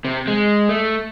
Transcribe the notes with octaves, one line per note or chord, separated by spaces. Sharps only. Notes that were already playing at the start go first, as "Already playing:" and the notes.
C3
G#3
A3